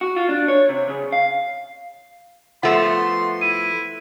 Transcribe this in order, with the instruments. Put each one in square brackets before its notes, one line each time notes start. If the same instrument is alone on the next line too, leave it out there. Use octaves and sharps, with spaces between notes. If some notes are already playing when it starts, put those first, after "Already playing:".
[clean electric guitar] F#4
F4
D4
C#5
C3
C#3
F5
[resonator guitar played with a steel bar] F3 A3 B3 [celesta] F#5 [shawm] C6
[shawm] E4 [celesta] D#7